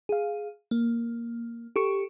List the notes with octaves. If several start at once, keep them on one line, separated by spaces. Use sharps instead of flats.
G#4 F5
A#3
G4 A4 C#6